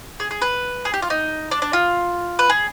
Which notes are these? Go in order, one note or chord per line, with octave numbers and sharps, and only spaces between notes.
G#4
G#4
B4
G#4
G4
F4
D#4
D4
D4
F4
B4
G#4